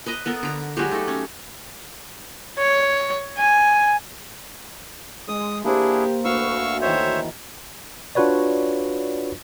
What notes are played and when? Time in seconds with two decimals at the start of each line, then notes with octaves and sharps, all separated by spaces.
0.06 B4 D#5 A#5
0.26 B3 A4 A#4
0.43 D3 A#5
0.77 F#3 G#3 F#4 G4
0.92 A3 D#4 A4
1.08 C#4
2.59 C#5
3.38 G#5
5.28 G#3 C6 D#6
5.64 A#3 D4 E4 G4 G#4 C5
6.25 D2 F#4 B4 F5 C#6 E6
6.81 D#3 E3 C5 C#5 E5 C#6
8.15 D4 F4 F#4 B4 C#5 D5